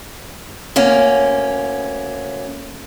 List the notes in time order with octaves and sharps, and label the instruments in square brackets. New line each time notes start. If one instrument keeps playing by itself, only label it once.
[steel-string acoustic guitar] D2 A#3 C#4